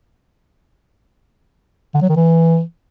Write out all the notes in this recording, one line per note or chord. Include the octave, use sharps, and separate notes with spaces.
D3
F#3
D#3
E3